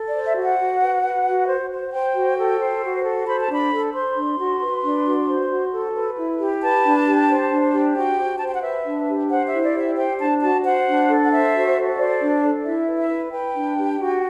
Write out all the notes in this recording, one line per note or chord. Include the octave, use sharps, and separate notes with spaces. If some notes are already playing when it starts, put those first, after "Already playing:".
Already playing: A4
D5
C5
E5
F#4
F#5
F#4
B4
B4
F#4
C5
C5
C5 G5
F#4
A4
C5
F#4
A4
C5 B5
A5
D4 B5
A4
C5 C6
D4
F#4
B4
D4
F#4
C5
F#4
A4
B4
E4
G4
B4 A5
D4
G4
C5
D4
G4
F#4 G5
C5
A5
C5
G5
F#5
B4 E5
D4
G4
C5 F#5
E4 E5
D5
G4
E5
C5 G5
D4 A5
F#4 A5
C5 F#5
D4
A4
F#5
C5 E5
F#4
A4
E5
C5 D5
D4
A4
E4 E5
B4
E5
B4
B4 G5
D4
G4
F#4